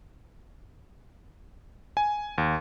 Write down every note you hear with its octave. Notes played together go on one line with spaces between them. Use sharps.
G#5
D#2